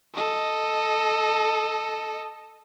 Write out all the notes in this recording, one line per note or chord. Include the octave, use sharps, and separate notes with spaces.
A4 D#5